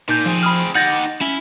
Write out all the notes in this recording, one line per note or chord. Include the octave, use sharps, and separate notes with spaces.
A#2 D#4 G6
F3 C4 G#4
B5 D#6 F6
D#4 G4 F#5 G6 A6 A#6
C#4 E4